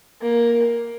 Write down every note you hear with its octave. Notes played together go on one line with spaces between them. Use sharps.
A#3